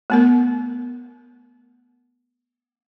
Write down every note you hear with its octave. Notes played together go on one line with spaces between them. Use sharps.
A3 B3 A#4